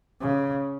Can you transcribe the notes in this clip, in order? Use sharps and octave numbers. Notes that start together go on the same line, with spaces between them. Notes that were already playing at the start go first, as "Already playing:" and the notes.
C#3